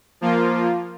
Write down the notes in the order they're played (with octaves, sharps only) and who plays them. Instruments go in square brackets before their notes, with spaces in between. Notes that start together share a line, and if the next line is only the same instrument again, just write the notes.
[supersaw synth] F3 A#3 F4